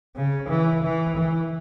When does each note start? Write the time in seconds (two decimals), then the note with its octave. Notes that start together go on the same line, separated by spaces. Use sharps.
0.16 C#3
0.49 E3
0.83 E3
1.17 E3